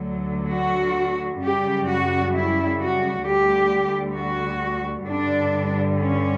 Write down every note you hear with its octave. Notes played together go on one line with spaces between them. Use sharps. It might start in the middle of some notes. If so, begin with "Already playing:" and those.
Already playing: D2 D3 F#3
F#4
F#2 C#3 G3 G4
F#4
E4
F#4
D2 D3 G3 G4
F#4
G2 D3 G3 D4
C#4